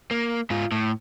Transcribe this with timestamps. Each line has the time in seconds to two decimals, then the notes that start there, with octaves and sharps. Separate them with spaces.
0.11 A#3
0.50 G#2 F4
0.72 A2